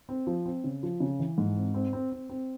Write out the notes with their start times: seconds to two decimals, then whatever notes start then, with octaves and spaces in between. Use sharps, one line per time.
0.09 C4
0.27 F3
0.46 C4
0.64 C#3
0.83 F3
1.00 C#3
1.19 E3
1.38 G#2
1.57 C4
1.74 C4
1.93 C4
2.12 C4
2.29 C4